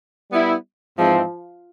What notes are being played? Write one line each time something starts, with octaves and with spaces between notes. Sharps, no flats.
G3 B3 E4
G#2 E3 F3 G#3 C4